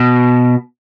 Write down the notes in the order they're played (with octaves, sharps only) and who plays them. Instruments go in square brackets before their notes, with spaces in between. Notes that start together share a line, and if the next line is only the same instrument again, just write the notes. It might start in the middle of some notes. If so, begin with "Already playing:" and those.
Already playing: [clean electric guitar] B2